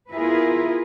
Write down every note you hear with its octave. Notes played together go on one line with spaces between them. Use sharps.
B3 E4 F4 G#4 A#4 B4